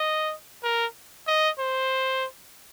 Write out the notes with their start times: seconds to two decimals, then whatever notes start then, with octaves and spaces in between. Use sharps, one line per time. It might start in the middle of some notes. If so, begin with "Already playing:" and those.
Already playing: D#5
0.64 A#4
1.27 D#5
1.59 C5